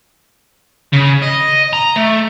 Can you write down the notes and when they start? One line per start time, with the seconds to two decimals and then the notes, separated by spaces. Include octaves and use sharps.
0.93 C#3
1.22 D#5
1.73 A#5
1.96 A3